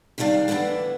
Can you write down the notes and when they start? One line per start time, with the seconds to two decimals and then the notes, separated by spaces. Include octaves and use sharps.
0.18 C3 D#3 G3 G#3 D4 F5
0.48 A2 D3 E3 B3 D4